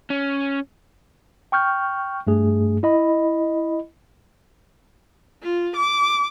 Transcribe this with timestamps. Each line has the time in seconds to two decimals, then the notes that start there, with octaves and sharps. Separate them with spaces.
0.10 C#4
1.52 G5 C#6 F6 G6
2.27 G2 A3 G#4
2.83 E4 D#5 B5
5.43 F4
5.76 D6